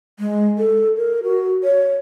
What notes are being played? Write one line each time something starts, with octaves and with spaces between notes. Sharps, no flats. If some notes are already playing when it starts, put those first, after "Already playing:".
G#3
A4
A#4
F#4
C#5